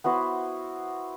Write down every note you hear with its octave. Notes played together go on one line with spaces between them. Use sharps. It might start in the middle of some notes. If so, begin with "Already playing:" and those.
B3 E4 F#4 C5